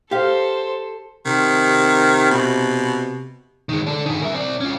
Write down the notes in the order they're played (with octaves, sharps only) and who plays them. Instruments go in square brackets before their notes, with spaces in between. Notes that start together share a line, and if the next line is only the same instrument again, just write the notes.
[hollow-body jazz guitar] G4 F5 [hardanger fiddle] A4 C5
[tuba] C3 [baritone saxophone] D#3
[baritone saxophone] B2
[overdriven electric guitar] D#3 G#3
D4 A4
D#3 G#4
A#4 E5
C4 D5
C#4 F4